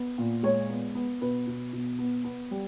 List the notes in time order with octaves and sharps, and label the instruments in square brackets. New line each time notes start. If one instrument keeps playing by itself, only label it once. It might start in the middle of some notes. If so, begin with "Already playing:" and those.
Already playing: [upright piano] B3
A#2
G#3 C#5
B3
B3
B2 B4
B2
B2
B3
B3
G3